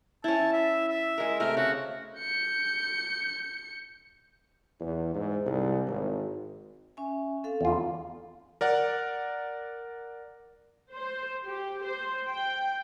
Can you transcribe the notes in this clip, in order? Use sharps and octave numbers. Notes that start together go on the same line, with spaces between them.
C#4 E4 A5
E5
E5
G#3 A#4
C3 A3 A#4
C#3 F#4
G6 C#7
E2
G#2
C2
G#1
C#4 E5 G#5
C4 A4 F5
E2 F4
A#4 D5 F#5
C5
G4
C5
G5